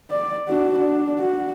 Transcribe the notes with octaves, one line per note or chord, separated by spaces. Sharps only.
D5
D4 F#4
D4
F#4